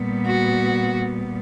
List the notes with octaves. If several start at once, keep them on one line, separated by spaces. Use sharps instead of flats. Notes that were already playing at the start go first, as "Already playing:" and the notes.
Already playing: A#2 G3 B3
F#4